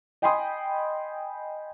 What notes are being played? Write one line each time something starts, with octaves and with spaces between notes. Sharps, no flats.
D#5 G5 G#5 B5 C6 D#6